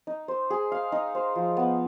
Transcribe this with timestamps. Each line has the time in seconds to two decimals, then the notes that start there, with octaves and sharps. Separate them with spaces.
0.07 D#4
0.28 C5
0.50 G#4
0.72 F5
0.92 D#4
1.15 C5
1.36 F3
1.57 B3